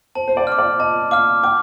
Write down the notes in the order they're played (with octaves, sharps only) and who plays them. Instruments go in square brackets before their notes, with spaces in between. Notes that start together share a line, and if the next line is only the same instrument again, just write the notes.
[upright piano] C5 [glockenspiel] A5
[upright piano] C5
D5
[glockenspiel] D6 F6
[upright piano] D5
[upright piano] D#5 [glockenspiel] A5
[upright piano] F5 [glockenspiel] D6 F6
[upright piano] G5 [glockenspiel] D6